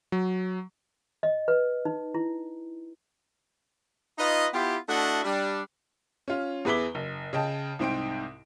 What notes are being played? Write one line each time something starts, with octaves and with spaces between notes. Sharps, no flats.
F#3
D#5
B4
D#4
E4
D#4 F4 B4 D#5
B3 E4 F4 G4
A3 D4 E4 F#4 D#5 F#5
G3 D4
C#4 F4
E2 G#4 B4 E5 D6 G7
F#1
C#3 D#5 G5 A5
C2 G#2 C4 G5 C6 D7